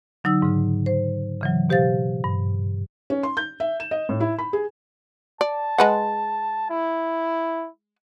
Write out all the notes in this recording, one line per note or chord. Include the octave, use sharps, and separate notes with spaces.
D3 F#3 D#4 E6
G#2 C#3
C5
C#3 E3 F#3
B2 G4 C5 F5 A6
G2
C#4
C6
G6
E5
E7
D#5
A2
E4
B5
G#4
D5 A5
G#3 B4 F#5
E4